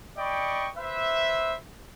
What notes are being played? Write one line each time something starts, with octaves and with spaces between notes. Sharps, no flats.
D5 D#5 G5 B5 C#6
B4 C5 E5